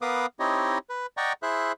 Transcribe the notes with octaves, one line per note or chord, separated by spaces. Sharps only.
B3 A#4 B4 F5 D6 D#6
C4 D#4 E4 G4 C#5 D#5
B4
D5 D#5 F#5 G5 A#5 C#6
E4 G#4 C5 E5 F#6